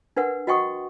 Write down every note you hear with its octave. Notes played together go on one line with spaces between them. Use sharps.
D4 A#4 B4 F#5
F#4 D#5 F#5 G5 C#6 D#6